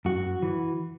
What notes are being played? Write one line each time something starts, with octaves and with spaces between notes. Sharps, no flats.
F#2 F#4
E3